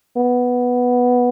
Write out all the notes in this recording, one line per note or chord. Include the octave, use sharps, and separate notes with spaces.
B3